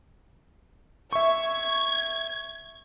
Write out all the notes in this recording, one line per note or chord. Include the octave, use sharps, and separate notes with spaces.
E5 C#6 G#6